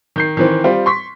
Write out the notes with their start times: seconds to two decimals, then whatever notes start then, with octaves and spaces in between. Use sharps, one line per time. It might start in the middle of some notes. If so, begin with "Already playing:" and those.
0.16 D#3 G6 C7
0.37 D#3 E3 C4
0.64 G3 C4 F4
0.86 C6 C#6 B6